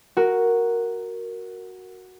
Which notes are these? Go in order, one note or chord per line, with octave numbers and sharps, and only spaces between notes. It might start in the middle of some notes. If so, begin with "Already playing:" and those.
F#4 A#4